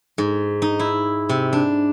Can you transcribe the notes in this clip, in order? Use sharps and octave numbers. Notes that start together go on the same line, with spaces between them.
G#2
D#4
E4
C3
D4